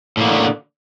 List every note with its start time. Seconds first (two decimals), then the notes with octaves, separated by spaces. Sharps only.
0.17 A2
0.21 A#3
0.24 B3
0.28 D3